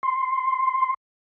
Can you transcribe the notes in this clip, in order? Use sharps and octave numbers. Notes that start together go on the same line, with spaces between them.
C6